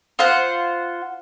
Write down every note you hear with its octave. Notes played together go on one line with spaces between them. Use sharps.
F4 C5 F#5